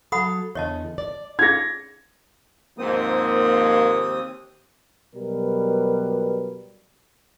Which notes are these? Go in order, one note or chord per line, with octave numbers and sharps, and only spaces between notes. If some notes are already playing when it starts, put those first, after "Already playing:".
F#3 A4 F#5 B5 D#6
E2 D3 C#5 D#5 A5
D5
C#4 D#4 F4 G#4 G#6 A#6
D#2 G#2 F3 A#3 C4 D#6
B2 F#3 G3 A#4 B4